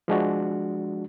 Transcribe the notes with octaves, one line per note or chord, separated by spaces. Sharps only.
F3 G#3 D4 F#4